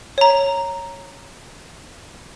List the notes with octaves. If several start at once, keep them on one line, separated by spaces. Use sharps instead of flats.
C#5 A#5